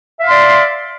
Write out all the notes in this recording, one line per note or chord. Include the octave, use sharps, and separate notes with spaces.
D5 E5 F5 C6